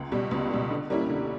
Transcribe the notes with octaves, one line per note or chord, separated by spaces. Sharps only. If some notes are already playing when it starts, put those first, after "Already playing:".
Already playing: C#2
B2 G3
C#2
B2 G3
D3
G3 A#3 C#4 E4
D3